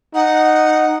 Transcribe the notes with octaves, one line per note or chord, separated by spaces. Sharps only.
D#4 F#5